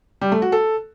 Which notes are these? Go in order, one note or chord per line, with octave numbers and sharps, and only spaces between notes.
G3
A3
F#4
A4